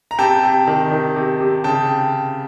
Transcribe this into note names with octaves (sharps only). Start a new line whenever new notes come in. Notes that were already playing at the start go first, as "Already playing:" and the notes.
A#5
C3 G5 A5
C3
D#3
D#3
C3
C3
C#3 G5 A5